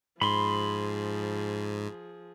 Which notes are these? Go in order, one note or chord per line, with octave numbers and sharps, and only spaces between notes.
G#2 F3 G#4 B5 C6